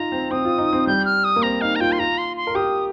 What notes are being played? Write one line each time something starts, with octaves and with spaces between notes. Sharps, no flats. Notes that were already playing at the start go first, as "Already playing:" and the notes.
Already playing: D#4 F4 A#5
C4
C4 D#6
F4
D#4
C4
G3 G6
F6
D#6
A#3
C4 A#5
D#4 F5
A#5
F4 G5
C6
F4 A#5
C6
C6
A#4
G4 D#6